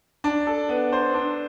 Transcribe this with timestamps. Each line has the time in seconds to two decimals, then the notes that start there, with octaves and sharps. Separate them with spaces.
0.24 D4
0.47 A4
0.69 B3
0.92 C5
1.14 D4